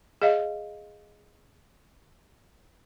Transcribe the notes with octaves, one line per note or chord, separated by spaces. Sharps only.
G#4 D#5 F5